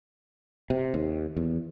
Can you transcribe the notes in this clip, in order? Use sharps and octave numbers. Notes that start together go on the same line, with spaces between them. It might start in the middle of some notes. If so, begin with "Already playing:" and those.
C3
D#2
E2